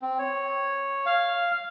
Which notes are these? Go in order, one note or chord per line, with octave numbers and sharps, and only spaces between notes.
C4
C#5
F5